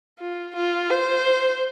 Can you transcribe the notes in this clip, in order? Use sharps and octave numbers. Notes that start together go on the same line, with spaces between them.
F4
F4
C5